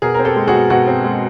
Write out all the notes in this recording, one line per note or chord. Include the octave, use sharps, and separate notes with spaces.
B2 G#4 A#4
C4 A#4
G4 A4
G#3
F#4 G#4
B2
B2 F#4
C4
G#3